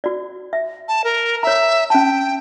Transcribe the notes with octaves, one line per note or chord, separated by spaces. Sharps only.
F#4 D5
E5
A5
A#4
C#5 E5 A#5
C#4 G5 A5